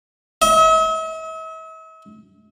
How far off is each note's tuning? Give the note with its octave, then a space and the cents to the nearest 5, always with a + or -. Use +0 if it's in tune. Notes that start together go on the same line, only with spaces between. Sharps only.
E5 -45